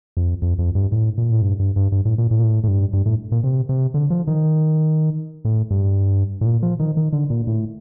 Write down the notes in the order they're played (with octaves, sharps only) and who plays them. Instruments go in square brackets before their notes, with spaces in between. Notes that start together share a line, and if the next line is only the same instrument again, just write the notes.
[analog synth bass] F2
F2
F2
G2
A2
A#2
A2
G2
G2
G2
G2
A2
A#2
A2
A#2
A2
A2
G2
G2
A2
A#2
C3
C3
D3
F3
D#3
A2
G2
A2
A#2
F3
D#3
D#3
D3
A#2
A2